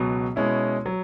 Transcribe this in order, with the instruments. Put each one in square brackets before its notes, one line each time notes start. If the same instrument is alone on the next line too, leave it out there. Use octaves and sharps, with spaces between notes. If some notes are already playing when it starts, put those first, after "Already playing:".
Already playing: [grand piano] C#2 B2 F#3
B2 G#3 C#4 E4
F#3